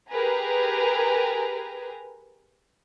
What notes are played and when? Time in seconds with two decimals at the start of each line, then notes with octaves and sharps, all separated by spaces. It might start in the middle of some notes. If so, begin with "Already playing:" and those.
0.10 G4 G#4 A#4 B4 G#5 A#5